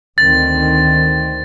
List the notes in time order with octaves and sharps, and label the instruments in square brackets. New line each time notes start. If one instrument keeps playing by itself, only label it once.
[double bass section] D2 D#3 C4 [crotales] A6